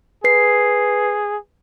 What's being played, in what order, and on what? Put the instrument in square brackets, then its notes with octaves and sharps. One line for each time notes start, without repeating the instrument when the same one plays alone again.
[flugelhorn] G#4 [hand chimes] B4 C7